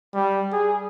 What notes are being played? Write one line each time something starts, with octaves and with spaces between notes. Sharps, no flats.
G3
G#4